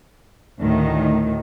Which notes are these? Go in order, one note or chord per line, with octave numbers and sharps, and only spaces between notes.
D2 A2 D#3